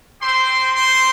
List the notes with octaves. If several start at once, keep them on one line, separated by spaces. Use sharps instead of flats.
C4 G4 C5 C6
C5 C6